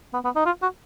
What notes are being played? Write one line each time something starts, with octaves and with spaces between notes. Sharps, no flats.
B3
B3
D#4
F4
F#4